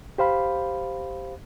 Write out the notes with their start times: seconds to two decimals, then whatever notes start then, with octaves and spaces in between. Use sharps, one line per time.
0.18 G4 C5 F5 B5